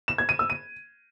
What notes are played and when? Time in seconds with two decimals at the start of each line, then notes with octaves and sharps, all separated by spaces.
0.08 E7
0.18 G#6
0.29 D#7
0.39 E6
0.50 D#7